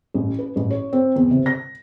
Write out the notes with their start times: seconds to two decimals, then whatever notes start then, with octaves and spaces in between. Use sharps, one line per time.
0.14 A1
0.39 B4
0.56 A1
0.71 C#5
0.93 C4
1.16 E2
1.31 C3
1.46 A#6